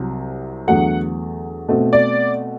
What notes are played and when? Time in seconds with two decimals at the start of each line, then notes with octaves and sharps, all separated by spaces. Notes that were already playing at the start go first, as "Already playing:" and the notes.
Already playing: C2 C3 F#3
0.67 E2 D3 F#3 A3 F#5
1.68 B2 A3 C4
1.93 D5